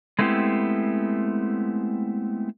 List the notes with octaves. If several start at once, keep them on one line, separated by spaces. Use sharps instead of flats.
G#3 A3 B3 C4 E4 G4